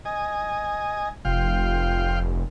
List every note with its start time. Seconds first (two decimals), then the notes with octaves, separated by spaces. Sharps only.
0.05 D#5 G#5
1.25 F1 F4 F5 G5